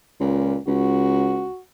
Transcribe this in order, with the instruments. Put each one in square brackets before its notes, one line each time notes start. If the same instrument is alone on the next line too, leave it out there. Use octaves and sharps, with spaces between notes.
[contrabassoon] C#2 [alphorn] A#2
[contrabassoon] C#2 [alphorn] F#4